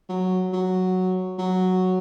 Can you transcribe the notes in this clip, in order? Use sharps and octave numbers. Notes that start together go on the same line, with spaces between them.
F#3
F#3
F#3